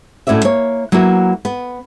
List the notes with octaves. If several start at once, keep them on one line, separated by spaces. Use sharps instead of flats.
A2 C#4 F#4 D5 E5
A#3 C#5
F#3 A#3 B3 E4 F#4
B3